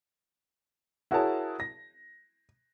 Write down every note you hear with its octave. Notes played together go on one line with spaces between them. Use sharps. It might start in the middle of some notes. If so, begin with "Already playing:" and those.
E4 F#4 G#4 A#4 C#5 A5
A#6